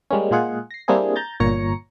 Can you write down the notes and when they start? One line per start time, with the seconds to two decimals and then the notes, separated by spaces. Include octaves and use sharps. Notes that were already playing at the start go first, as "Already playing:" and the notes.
0.11 G3 G#3 A#3 C#4
0.31 A#2 G#3 F4 G#4 F#5
0.71 A#6 C7
0.88 G3 A#3 C4 D4 E4 G#4
1.16 A#5 G6 A6
1.40 G1 A#2 C#5 A#5 A#6 C#7